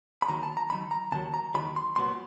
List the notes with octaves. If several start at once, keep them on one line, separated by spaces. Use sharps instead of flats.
B5
D#2 D#3 F#3 A#5
A5
A#5
D#2 D#3 F#3 B5
A#5
D#2 D#3 F#3 A5
A#5
D#2 D#3 F#3 B5
C6
C2 A#2 F#3 B3 C6